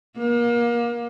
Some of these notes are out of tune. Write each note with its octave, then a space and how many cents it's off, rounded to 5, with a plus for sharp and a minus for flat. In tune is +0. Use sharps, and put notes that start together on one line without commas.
A#3 +30